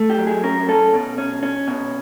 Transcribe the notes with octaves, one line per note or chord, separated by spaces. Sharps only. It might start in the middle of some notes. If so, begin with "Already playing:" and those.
Already playing: A3
G4
F#3
G#4
C#4 A#4
C#4 A4
B2
C#4
C#4
B2